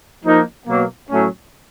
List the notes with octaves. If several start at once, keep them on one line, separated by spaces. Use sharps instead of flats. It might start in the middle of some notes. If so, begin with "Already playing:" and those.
F3 A#3 D#4
B2 F#3 A#3
A2 F#3 A3 C#4